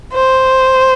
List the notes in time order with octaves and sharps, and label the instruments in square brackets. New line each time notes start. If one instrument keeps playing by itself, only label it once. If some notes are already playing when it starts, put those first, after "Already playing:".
[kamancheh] C5